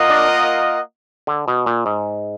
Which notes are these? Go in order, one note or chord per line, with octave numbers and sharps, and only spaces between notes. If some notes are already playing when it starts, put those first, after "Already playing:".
Already playing: A#3 F4 A#4 D#5 F#5
D4
D3
B2
A#2
G#2